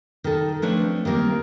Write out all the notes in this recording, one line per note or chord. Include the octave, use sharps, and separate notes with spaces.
D#3 A4
F3 A3 C4 D4 B4 C#5
D#3 G3 A#3 C4